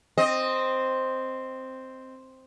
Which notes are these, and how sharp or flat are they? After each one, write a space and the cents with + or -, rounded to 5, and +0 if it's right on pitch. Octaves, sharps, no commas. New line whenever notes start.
C4 +0 D#5 +0